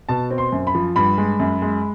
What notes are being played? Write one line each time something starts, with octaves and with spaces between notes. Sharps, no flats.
B2 A5
C4
C6
F#2
B5
F3
G2 B5
G#3
F#2
G#3